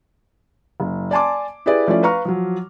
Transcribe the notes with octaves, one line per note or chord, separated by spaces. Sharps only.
F#1
D5 G#5 A5 C6 D6
E4 G4 G#4 B4 D5
F3 A3 C#4 E4 F4 D5
B4 F5 A#5 C#6 F6
F3 F#3